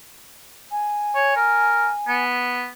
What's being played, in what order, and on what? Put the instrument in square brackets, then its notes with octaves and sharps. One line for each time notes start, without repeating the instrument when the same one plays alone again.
[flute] G#5
[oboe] C#5
A#4
B3